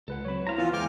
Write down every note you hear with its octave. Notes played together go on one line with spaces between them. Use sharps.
C#2 A4 B4 F#5
F#3 C4 C#5 B5
E4 F#4 C5 F5 A#5
E3 F3 B3 F4
E2 E3 G#3 A#4 G5 G#5 D6 F6